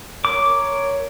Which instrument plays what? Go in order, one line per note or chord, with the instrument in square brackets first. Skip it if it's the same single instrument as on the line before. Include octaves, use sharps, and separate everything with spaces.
[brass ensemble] A#4 C#5 [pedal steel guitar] D6